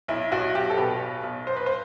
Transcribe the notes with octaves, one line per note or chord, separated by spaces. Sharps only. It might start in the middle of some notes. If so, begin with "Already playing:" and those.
B1 E4
B1 F#4
B1 G4
A4
B2 B4
B1
B1
B3 C5
B4
C5